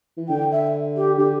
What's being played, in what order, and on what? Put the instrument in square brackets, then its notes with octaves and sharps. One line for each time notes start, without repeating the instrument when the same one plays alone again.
[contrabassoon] E3
[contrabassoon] D3 [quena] G5
[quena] E5
G4
[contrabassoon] D3 [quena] G4